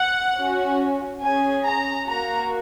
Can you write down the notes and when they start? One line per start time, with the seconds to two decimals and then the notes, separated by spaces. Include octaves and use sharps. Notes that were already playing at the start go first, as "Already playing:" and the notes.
Already playing: F#5
0.37 C#4 F#4
1.22 C#4 G#4 G#5
1.65 A#5
2.08 A#3 F#4 A#5